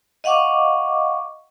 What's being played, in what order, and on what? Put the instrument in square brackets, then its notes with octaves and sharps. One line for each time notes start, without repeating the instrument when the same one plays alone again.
[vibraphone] D#5 F5 F#5 C#6 D6